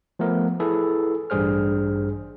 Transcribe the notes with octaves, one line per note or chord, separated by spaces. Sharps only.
F3 A3 B3 A#4 B4
E4 G#4 A4 B4
A1 G2 G3 G#4 C5 F6